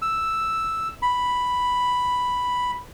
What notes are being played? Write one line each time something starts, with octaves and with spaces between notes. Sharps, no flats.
E6
B5